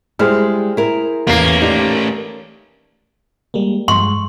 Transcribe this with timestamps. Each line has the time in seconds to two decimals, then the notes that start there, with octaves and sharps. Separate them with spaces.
0.19 G3 G#3 E4 G#4 C5 F6
0.77 E4 A#4
1.27 A1 E2 A3 A#3 C#4 C7
1.62 D#4 G4 D5
3.54 G3 G#3 A#3
3.88 G2 F3 G#3 C6 C#6